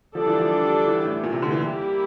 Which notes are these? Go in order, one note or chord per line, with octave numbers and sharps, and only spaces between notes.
D3 F3 G3 D4 A4 D5
E3
F3
E3
A2
A#2
C3
D3
E3
G3 A#3 E4 G4